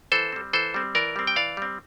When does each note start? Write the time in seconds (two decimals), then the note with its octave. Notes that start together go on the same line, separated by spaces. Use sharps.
0.12 E3 A4 C5
0.32 G3 C4
0.53 E3 A4 C5
0.74 G3 C4
0.95 E3 A#4 D5
1.16 G3 C4
1.27 G5
1.36 E3 D5 F5
1.57 G3 C4